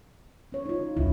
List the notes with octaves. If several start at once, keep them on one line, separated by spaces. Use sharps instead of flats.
C#4 C#5
D#4 F4
D#1 C2 F2 C#4 E4